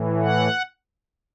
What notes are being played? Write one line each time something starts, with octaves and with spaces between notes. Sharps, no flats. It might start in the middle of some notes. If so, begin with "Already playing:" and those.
Already playing: A2 E3
F#5